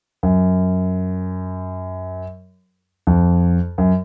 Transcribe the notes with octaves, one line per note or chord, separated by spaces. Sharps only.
F#2
F2
F#2